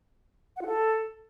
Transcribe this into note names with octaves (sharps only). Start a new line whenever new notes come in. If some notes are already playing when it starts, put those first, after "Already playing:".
F#5
F4
A4